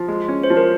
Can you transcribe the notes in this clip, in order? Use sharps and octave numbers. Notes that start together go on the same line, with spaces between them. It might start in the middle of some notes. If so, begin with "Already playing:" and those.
Already playing: F3
G#3
C#4
C5
F3
A#4